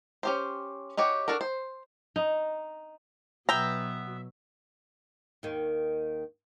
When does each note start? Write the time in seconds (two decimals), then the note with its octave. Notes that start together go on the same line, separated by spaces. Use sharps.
0.23 C#4 G4 C5
0.97 D#4 F#4 G4 C#5
1.28 D4 F#4 A4 A#4
1.41 C5
2.16 D#4
3.49 B2 F#3 B3 E5 G5 A#5
5.43 D#2 D#3